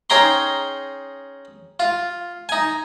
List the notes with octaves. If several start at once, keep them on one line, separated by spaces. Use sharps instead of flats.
C#4 D#4 G#4 G5 A#5 C6
F4
D#4 G#5